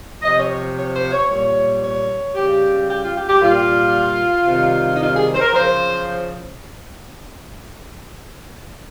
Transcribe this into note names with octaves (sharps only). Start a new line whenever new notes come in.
C3 F3 D#5
C#5
C#5
C#5
C5
C#5
A#2 G3 C#5
C#5
C#3 G3 G4
G4
F4
G4
G4
A#2 G3 F4
C3 D#3 G3
D#4
F4
G#4
C5
A#4
C#3 F3 C5